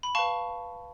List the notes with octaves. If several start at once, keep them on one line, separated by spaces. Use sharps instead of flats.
B5
B4 F5 A5 C#6